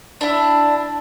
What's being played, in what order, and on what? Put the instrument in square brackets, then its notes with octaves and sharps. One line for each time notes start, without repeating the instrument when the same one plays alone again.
[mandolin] D4 E4